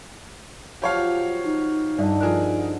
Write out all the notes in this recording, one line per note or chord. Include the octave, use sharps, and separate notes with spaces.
F3 F#3 G4 C#5 F5
D#4
G2 D3 G3 D5 D#5
F3 F4 G#4 A#4 F#6